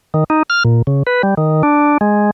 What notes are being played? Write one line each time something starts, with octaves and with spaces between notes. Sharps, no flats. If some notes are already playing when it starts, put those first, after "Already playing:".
D#3
D#4
F6
A#2
C#3
B4
G3
D#3
D4
G#3